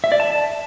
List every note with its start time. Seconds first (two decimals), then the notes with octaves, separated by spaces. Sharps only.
0.04 E5
0.12 D5
0.20 A5